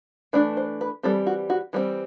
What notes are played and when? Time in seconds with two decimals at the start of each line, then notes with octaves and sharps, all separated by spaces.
0.33 E3 A3 D4 D5
0.57 C5
0.81 B4
1.03 E3 G3 C4 A4
1.27 F#4
1.50 F#4
1.73 E3 G3 C4